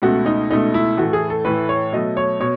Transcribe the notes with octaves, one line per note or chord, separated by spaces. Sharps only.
C#2 B2 A3 F#4
D#4
C#2 B2 A3 D#4
E4
A2 E3 A3 F#4
G#4
A4
A2 E3 A3 B4
C#5
B2 F#3 A3 D#5
C#5
B2 C#5